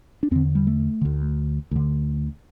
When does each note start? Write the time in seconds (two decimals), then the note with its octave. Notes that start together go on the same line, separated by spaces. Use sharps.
0.23 D4
0.31 E2 D3 C4
0.55 G3
0.67 A3
1.01 D2 D3
1.71 D2 D3